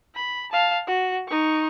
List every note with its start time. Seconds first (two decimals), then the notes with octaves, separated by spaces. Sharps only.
0.15 B5
0.52 F5 A5
0.87 F#4
1.28 D#4 C#6